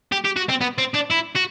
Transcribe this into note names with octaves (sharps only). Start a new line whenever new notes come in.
G4
G4
F#4
C4
B3
C4
D4
E4
F#4